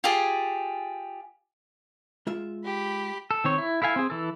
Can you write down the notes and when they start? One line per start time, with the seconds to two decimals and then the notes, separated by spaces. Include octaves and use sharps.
0.04 F4 G4 G#4
2.27 G#3 F4 E5
2.65 G4 B5
3.31 A4
3.44 D#3 C4 C#5
3.58 E4
3.82 E4 A4 F5 G#5
3.96 C4 G#4
4.10 E3 A4